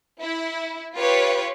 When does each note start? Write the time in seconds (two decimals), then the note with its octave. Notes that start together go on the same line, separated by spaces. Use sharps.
0.23 E4
0.97 F4 G4 B4 C#5